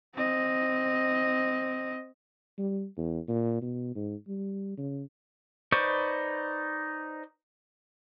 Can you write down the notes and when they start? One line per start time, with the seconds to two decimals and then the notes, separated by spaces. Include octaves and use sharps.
0.15 C4 D#5
2.58 G3
2.97 E2
3.28 A#2
3.62 B2
3.95 G#2
4.28 G3
4.77 C#3
5.72 D#4 B4 C5 D5 C#6